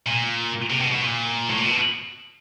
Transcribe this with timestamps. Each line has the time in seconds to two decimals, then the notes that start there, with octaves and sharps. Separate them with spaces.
0.06 A#2
0.70 C3
0.80 B2
0.91 B2
1.02 A#2
1.50 A2
1.58 A#2
1.66 B2